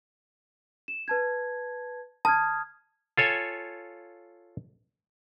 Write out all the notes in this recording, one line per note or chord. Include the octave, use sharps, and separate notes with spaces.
E7
B4 A5 G#6
A5 D#6 F6 G#6
F4 A4 C#5 G#5